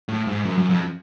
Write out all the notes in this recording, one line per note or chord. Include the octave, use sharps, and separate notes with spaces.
A2
G#2
F#2
F#2
F2